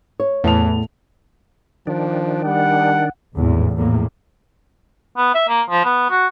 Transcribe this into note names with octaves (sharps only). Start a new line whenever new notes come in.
C#5
E2 A2 A5 F7
D#3 F3 D4
G3 F#5
G#1 E2 A2
A#1 E2 A2 A#3
B3
E5
A#3
F3
B3
F#4